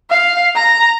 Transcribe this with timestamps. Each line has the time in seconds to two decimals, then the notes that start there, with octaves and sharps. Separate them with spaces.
0.10 F5
0.55 A#5